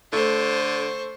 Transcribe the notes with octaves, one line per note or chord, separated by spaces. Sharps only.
D3 A3 C5 C#6